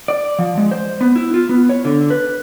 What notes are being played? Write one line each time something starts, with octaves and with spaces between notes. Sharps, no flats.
D5
F3
G#3
C5
B3
E4
F4
B3
C#5
D3
B4